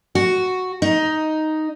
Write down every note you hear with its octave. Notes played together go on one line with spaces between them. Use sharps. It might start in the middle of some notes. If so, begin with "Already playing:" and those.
F#4
D#4